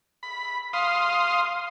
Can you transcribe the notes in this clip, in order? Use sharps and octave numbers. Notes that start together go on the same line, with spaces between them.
B5
F5 C6 D#6